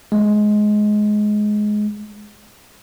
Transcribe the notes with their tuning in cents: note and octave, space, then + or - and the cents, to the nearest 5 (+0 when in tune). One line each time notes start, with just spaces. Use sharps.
G#3 +15